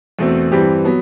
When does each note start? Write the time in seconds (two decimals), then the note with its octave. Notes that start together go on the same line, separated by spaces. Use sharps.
0.19 E2 B2 A3 C4
0.52 G2 E3 G3 C4 G4
0.85 F#3 B3